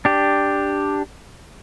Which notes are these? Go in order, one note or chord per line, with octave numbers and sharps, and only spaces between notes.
D4 G4